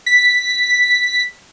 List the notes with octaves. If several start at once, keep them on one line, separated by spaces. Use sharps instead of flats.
B6